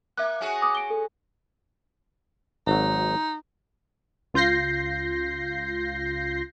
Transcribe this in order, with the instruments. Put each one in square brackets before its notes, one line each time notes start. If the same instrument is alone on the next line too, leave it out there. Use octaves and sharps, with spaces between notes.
[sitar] A#3 [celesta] E5 F#6
[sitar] C#4 F#4 G#4
[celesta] D6 D#6
D7 G7
A4
[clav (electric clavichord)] G#1 F#3 [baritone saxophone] D#4
[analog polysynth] C#2 F4 G6 A#6 C7